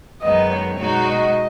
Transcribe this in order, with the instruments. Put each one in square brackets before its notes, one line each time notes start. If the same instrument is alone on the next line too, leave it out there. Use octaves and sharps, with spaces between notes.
[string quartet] F#2 D#3 G#3 B3 D#4 [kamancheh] D#5
[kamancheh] C#5
[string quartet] B2 G#3 D#4 F#4
[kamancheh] D#5